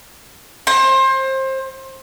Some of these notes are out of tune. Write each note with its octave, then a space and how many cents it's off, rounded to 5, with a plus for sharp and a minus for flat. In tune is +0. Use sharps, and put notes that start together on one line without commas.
C5 +25